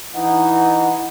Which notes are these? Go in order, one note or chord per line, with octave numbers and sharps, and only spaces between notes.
E3 D#4 F#5